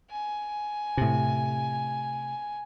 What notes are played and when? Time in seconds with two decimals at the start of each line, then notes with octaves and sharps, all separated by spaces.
0.10 G#5
0.97 A2 C3